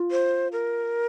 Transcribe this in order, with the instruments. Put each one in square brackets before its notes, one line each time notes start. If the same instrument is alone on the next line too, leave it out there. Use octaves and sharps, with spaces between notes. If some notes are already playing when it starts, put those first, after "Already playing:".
Already playing: [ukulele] F4
[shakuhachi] C5
A#4